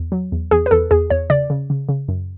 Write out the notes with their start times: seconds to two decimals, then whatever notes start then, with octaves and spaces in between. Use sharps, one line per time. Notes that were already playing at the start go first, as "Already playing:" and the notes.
Already playing: E2
0.12 F#3
0.32 E2
0.51 E2 G#4
0.66 B4
0.71 E2 A4
0.91 E2 G#4
1.10 E2 C#5
1.30 C#3 D5
1.50 C#3
1.70 C#3
1.89 C#3
2.08 F#2